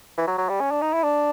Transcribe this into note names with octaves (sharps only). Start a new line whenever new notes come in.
E3
F#3
F#3
G3
C#4
D4
D#4
E4
D4